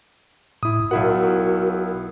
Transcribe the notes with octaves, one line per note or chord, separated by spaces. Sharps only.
A2 E4 D#6
B1 E4 F#4 A#4 F#5